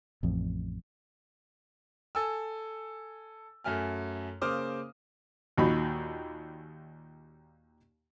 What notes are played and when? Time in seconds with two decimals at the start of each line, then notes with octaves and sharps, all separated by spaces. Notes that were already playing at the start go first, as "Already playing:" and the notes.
0.23 A1 F2
2.15 A4 G#5 E6
3.64 F#2 A3 G#5 F6
4.41 C#3 A#3 C5 D6 D#6 F6
5.58 D#2 A#2 D#4 F#4 B5